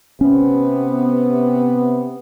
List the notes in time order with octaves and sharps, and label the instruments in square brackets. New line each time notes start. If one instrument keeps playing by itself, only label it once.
[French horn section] C3 B3 [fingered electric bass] C#4